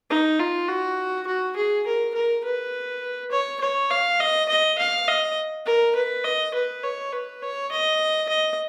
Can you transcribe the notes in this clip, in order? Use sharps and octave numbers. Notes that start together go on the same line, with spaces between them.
D#4
F4
F#4
F#4
G#4
A#4
A#4
B4
C#5
C#5
F5
D#5
D#5
F5
D#5
A#4
B4
D#5
B4
C#5
B4
C#5
D#5
D#5